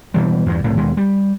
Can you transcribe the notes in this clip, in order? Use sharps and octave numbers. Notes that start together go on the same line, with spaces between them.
B2 E3 G3
E2 G2
B1 A2 C3
D#2 B2 G#3
G3